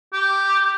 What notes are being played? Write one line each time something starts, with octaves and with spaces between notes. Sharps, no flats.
G4